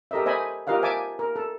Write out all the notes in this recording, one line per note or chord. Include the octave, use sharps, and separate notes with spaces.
G4 A4 A#4 D#5 E5
C5 D#5 E5 G#5 B5
F4 G4 A#4 D#5 F5 F#5
C5 E5 G#5 A5 D6
A#4
A4